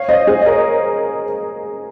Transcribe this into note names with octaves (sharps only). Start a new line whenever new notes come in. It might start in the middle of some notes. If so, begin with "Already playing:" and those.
Already playing: C#5 F5
C5 D#5
G#4 C5
D#5
A#4 C#5